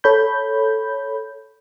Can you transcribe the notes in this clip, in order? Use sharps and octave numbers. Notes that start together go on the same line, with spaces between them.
A4 C#5 B5 G6